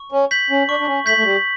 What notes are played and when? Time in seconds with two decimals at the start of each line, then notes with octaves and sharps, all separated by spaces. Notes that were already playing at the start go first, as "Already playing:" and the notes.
Already playing: C#6
0.12 C#4
0.31 G6 B6 F#7
0.50 C#4
0.68 D4 C#6
0.80 D4
0.86 C#4
1.06 A3 G6 B6 F#7
1.17 A3
1.24 G3